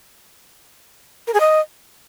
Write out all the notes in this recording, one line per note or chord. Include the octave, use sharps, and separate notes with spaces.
A#4
G#4
D#5